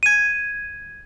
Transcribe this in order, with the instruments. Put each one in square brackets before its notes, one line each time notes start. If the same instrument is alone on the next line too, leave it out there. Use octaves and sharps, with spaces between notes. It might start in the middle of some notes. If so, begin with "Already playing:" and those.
[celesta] G#6 D#7